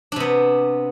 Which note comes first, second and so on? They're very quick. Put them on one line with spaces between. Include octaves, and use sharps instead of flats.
D4 C3 B3